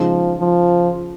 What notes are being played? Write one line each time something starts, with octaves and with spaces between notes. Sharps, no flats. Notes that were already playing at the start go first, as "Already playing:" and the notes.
Already playing: C#3 F3 G#3 D#4
F3